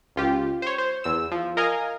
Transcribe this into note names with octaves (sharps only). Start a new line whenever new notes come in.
C#2 F4 G4
C5 C#5
C5
E2 E6
F3
A#4 D#5 F5 G#5 A#5